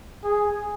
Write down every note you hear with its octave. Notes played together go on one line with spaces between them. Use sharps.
G#4